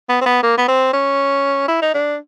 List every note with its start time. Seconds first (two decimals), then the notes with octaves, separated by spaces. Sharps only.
0.09 B3
0.21 C4
0.26 B3
0.43 A#3
0.58 B3
0.68 C4
0.94 C#4
1.68 E4
1.82 D#4
1.94 D4